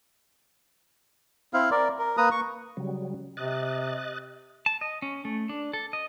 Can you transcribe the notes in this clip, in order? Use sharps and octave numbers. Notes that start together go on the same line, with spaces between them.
C4 E4 F5
A#4 D5
A#4
A#3 B4 A#5 D#6
C#6
C#3 F#3 G3
C3 D#5 F#6 A6
A5
D#5
C#4
A3
D4
A4
D#5